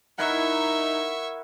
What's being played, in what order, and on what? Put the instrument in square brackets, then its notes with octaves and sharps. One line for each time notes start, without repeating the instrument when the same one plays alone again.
[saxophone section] D#4 [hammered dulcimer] E4 A#4 F#5 [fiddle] E5 C#6